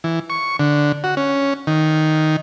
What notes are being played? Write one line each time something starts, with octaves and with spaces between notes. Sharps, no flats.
E3
C#6
D3
F#4
C#4
D#3